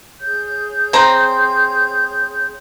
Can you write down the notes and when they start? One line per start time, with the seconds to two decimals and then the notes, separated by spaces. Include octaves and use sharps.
0.19 G#4 C#5 G6
0.93 C4 C5 A#5